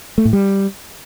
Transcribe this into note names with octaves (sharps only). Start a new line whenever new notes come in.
A3
A2
G3